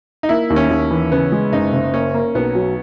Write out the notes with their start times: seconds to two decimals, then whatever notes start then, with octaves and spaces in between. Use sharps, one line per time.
0.23 D#4
0.29 A#3 E4
0.50 D#2
0.56 C#4
0.70 D#2
0.91 E3
1.11 C#3 B3
1.32 G#3
1.52 F#1 D#4
1.73 F#1
1.94 A#3 C#4
2.14 A#3
2.35 B1 B3
2.55 F#3